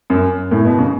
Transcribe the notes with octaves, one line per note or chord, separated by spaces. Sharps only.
F#2
A2
B2
C#3